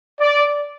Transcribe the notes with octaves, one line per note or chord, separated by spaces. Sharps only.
D5